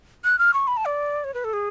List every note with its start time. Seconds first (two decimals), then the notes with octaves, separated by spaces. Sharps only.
0.24 F#6
0.39 F6
0.53 C#6
0.67 B5
0.77 A5
0.86 D5
1.24 C#5
1.34 B4
1.44 A4
1.53 G#4